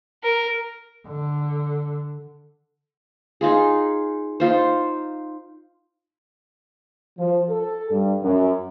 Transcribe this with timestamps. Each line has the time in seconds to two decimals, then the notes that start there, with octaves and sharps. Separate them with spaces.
0.23 A#4
1.08 D3
3.41 D#4 F4 G#4
4.40 D#4 F4 C5
7.18 F3
7.49 A4
7.90 G2
8.23 F#2